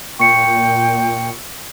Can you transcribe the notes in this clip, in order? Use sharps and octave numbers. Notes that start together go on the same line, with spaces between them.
A#2 G5 C#6 C#7